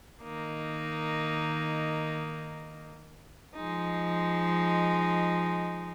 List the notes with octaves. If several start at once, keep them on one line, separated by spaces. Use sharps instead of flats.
D#3 A#3 D#4
F3 G#3 D#4